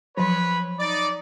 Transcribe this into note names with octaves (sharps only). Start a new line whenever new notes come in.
F3 F#3 B4 C#5 B5
D#4 D5